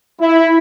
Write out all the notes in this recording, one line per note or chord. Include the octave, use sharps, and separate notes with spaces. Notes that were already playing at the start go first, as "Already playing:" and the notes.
E4